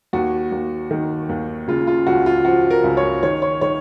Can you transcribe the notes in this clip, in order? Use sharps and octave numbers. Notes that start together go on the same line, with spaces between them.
D#2 F#4
D#2
D#3
D#2
C#3 F4
F4
C#2 F#4
F4
F3 F#4
A#4
C#2
C#5
D#3 C#5
C#5
D#3 C#5